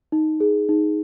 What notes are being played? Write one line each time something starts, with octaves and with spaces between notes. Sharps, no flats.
D#4
G#4
D#4